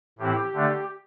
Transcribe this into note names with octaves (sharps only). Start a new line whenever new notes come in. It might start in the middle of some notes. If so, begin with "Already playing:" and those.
A2 E3 C4 E4 G4
D3 A3 D4